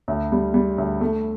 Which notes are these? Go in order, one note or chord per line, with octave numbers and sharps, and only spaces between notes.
D2
G3
G3
D2
A3